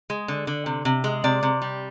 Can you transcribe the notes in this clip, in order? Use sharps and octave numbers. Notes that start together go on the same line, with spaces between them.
G#3
D3
D3
C3
C3
G#3
C3 D5
C3
G3